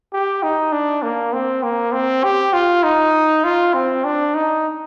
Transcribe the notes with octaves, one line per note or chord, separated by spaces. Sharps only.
G4
D#4
D4
A#3
C4
A#3
C4
G4
F4
D#4
F4
C4
D4
D#4